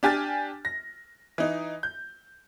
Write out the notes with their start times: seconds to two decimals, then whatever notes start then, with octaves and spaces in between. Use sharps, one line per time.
0.03 D4 G4 G#5 F6 A6
0.65 A#6
1.38 E3 D#4
1.83 G6